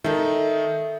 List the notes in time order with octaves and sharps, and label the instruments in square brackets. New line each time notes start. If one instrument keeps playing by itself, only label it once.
[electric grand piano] D#3 D#4 [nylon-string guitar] A4 E5